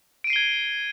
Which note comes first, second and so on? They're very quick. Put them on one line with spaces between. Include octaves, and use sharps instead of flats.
D7 D#7 C7 G7 G#6